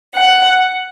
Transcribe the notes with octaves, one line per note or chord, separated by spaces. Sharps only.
F#5